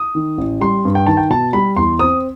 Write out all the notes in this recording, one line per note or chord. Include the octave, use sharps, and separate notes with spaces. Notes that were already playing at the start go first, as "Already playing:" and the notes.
Already playing: D#6
D#3
A1
G3 C6
G2
G5
D#3 A5
G5
B2 A5
G3 B5
E2 C6
C4 D#6